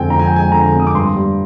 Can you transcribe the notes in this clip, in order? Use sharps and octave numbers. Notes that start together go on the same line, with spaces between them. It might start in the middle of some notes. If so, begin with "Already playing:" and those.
Already playing: F2 D3 G#3 C4 G5 G#5
F2 A#5
G#5
G5
G#3 G#5
D3 A#5
C4
D#6
D6
G2 C6
G3